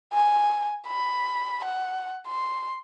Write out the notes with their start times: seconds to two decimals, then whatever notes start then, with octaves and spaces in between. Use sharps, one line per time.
0.12 G#5
0.88 B5
1.65 F#5
2.27 C6